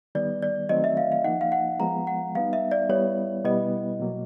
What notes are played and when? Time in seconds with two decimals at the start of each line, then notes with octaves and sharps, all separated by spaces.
0.15 D#3 G3 B3 D5
0.42 D5
0.69 D#3 F#3 A3 C4 D#5
0.84 E5
0.97 F5
1.12 F5
1.24 F3 A#3 D#4 F#5
1.41 F5
1.52 F#5
1.79 F3 G#3 B3 A#5
2.07 F#5
2.35 G3 B3 D#4 F5
2.53 E5
2.72 D5
2.89 G3 B3 E4 C#5
3.44 B2 G3 B3 E4 D#5
4.00 B2 F#3 A#3